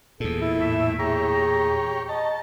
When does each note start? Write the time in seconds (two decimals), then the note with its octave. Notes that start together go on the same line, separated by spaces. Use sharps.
0.20 E2 A#2 G#4 A4
0.41 E4 A4
0.60 A2 E5
0.99 G4 G#4 C#5 A#5
2.09 D#5 A5